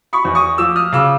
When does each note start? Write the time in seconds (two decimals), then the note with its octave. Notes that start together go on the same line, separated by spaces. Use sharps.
0.13 B5 C#6
0.25 E2
0.35 C#6 D#6
0.58 F3 D6 E6
0.76 D#6 F6
0.92 C#3 D6 E6